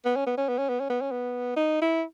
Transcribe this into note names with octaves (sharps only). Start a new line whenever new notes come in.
B3
C#4
B3
C#4
B3
C#4
B3
C#4
B3
C#4
B3
D#4
E4